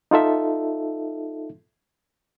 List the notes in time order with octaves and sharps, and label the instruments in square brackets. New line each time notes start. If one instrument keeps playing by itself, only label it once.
[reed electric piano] D#4 F4 A4 E5